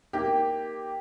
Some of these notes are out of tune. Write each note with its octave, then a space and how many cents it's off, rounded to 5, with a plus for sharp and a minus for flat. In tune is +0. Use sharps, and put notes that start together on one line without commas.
A#3 +0 D#4 +10 G4 +0